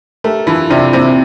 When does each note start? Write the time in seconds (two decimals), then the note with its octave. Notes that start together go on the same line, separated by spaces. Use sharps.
0.24 A3 G4 A#4
0.46 E3 F4 A4
0.70 C3 D4 F4
0.93 C3 C4 E4